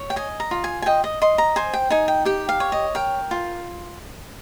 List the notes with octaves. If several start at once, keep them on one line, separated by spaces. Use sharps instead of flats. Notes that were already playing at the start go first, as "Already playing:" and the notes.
Already playing: C#5
G5
D#5 G#5
A#5
F4
G#5
G#5
D#5 G5
D#5
D#5 C6
A#5
C5 G#5
G5
D#4 G#5
G5
G4 G5
F5
C#5
D#5
A#4 G5
F4